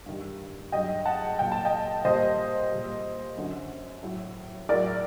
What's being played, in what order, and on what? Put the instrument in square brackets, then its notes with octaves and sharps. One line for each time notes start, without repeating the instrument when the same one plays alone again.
[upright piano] G2 D#3 G3
G2 F#3 D#5 G5
F#5 A5
A#2 F#3 G5
A5
D#5 G5
A#2 G3 C5 D#5
A#2 G3
F#2 D3 F#3
A2 F#3
A2 F#3 A#4 D5